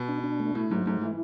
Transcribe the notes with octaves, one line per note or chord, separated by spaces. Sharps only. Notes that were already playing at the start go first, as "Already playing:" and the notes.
Already playing: B2
D4
D4
A3
A2 A3
G#2 F#3
G#2 A3
E3 E4